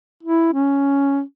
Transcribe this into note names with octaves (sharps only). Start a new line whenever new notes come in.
E4
C#4